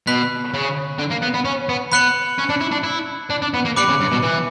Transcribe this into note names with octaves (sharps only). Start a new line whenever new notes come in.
B2 B5 F#6 B6
C#3
D3
A#3
B3
B3
C#4
B3
B3 B5 F#6 C#7 F#7
C#4
D4
E4
D4
E4
D4
D4
B3
A#3
G3 B5 D6 F#6 C#7 F#7
C#3
G2
B2
E3